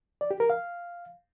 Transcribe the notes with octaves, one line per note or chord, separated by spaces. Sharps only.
D5
G4
A#4
F5